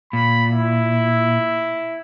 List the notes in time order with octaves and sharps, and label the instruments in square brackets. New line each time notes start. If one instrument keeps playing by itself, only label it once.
[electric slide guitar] A#2 [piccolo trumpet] B5
[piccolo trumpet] E4